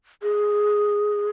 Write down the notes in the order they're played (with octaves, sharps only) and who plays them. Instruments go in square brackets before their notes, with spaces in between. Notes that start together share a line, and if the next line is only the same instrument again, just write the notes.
[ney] G#4